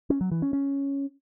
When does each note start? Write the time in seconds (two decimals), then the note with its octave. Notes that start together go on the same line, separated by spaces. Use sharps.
0.10 C#4
0.21 F#3
0.31 E3
0.42 C#4
0.53 C#4